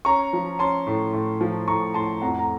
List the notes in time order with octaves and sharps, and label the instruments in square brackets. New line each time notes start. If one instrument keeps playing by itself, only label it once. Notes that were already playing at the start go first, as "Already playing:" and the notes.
[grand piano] C#4 A#5 C#6
F3
C#4 A5 C6
A2
A2
F3
A2 A#5 C#6
A2 A5 C6
F2 F#5 A#5
A#5